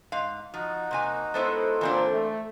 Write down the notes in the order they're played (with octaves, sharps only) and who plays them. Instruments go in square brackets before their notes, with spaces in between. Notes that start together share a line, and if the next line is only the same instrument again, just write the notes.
[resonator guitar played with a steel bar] G#2 F5
[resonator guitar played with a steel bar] F3 [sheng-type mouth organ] D#4 F#4
[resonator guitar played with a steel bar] C3 A#3 G#5
[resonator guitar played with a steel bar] G#3 B3 E4 [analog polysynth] A4 C5
[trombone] A#2 [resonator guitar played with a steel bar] E3 C4 D4
[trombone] A3